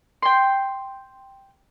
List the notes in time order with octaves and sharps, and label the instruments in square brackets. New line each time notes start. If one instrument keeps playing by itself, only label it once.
[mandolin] G5 C6